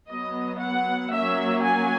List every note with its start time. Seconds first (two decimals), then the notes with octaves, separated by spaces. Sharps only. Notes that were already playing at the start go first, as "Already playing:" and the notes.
0.08 F#3 B3 D#5
0.60 F#5
1.12 F#3 A#3 C#4 E5
1.63 G#5